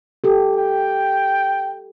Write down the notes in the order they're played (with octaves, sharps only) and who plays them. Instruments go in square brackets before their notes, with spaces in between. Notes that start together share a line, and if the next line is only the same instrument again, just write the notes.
[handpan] G4 A4
[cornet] G5